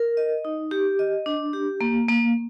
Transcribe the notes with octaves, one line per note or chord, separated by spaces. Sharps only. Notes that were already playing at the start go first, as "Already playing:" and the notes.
Already playing: A#4
D#5
D#4
G4
D#5
D4
G4
A#3
A#3